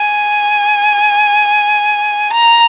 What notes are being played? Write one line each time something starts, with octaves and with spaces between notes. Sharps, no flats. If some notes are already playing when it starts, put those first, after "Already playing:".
Already playing: G#5
A#5